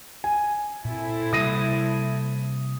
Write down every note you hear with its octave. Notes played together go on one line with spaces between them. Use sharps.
G#5
A#2 C4 E4 A4
C3 G3 A#3 D#6 A#6 D#7